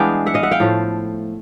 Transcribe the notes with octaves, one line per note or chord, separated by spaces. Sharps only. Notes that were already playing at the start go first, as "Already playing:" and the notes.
Already playing: E3 G#3 B3 D4 F5 G5
E5 F#5
D#5 F5
E5 F#5
F5 G5
A2 F3 A3